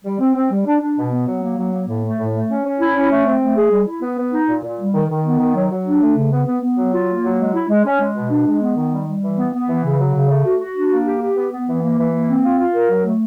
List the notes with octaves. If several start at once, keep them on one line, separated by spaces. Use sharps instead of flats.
G3
C4
C4
G3
D4
D4
B2
B3
F#3
A#3
F#3
A#3
A2
A3
A2
A3
C#4
C#4
E4
C#4
A3
C4
A3
G#4
G3
E4
B3
B3
D#4
A#2
A#2
G3
D#3
D#3
B3
D#3
F#3
F#3
D4
A3
C#3
B3
B3
B3
F#3
F4
A#3
F#3
G#3
E4
G#3
C#4
G#3
B2
D4
G#3
B3
D#3
G3
G3
E3
B3
B3
E3
C#3
F#3
C#3
A3
F#4
F#4
D4
A#3
G4
G4
B3
B3
E3
A#3
E3
A#3
C4
F4
F4
A#4
F#3
A3